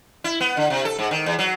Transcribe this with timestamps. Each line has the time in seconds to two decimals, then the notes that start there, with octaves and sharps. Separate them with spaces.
0.24 E4
0.40 B3
0.57 D3
0.70 C3
0.85 A4
0.99 G#2
1.11 D#3
1.26 E2
1.39 F#3